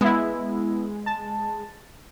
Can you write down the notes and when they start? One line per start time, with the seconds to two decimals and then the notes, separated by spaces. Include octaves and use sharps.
0.01 G#3 B3 E4
1.06 A5